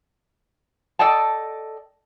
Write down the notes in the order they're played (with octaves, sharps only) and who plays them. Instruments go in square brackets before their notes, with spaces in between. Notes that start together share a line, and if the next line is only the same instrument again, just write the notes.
[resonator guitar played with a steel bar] A4 D5 D#5 G5 A5